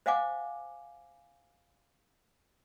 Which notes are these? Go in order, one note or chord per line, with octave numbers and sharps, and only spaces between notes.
C5 D#5 F5 F#5 G#5 D6